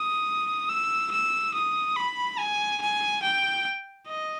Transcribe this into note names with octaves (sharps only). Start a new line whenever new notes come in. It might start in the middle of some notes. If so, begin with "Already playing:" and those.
Already playing: D#6
E6
E6
D#6
B5
G#5
G#5
G5
D#5